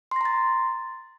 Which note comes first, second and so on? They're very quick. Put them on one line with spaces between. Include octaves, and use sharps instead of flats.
C6 A#6 A#5 A6